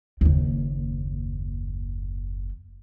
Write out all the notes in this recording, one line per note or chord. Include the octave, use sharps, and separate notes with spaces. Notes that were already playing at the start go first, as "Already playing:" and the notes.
F#1 D#2